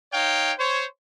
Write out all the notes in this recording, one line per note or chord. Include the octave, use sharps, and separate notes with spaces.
D#4 C#5 F5 G5
C5 C#5